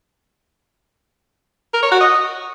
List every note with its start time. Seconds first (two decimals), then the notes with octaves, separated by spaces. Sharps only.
1.74 A#4
1.83 C#5
1.92 F#4
2.01 D#5